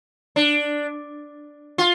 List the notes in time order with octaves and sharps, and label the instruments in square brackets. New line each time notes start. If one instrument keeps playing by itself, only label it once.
[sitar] D4
F4